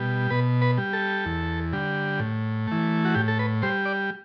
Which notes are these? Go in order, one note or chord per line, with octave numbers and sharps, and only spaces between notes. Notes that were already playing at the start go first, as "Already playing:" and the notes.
Already playing: B2 G3
B2 B4
B4
G3
A4
E2
D3 G3
A2
E3 A3
F#4
A2 G4
A4
B4
G3 C5
D5